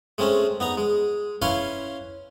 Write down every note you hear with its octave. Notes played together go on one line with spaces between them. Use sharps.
G#3 A3 C4 C#4
B3 D#4 A#5
G#3
C#4 E4 B4 C#5 F5 C6